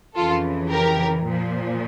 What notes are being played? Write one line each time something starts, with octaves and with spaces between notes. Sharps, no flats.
F2 C#3 E3 F4 A4
G4 A#4
A#2 F3